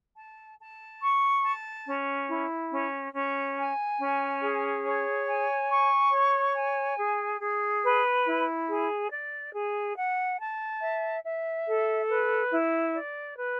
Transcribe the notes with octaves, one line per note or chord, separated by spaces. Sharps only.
A5
A5
C#6
A5
C#4
E4
C#4
C#4
G#5
C#4
G#4
C#5
G#5
C#6
C#5
G#5
G#4
G#4
B4
E4
G#4
D5
G#4
F#5
A5
E5
E5
A4
B4
E4
D5
B4